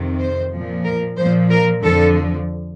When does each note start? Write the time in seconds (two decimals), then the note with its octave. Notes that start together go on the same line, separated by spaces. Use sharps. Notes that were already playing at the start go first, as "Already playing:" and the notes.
Already playing: F2 C3 D#3
0.18 C5
0.52 A#2 F3
0.84 A#4
1.17 A#2 F3 C5
1.51 A#4
1.83 F2 D3 F3 A4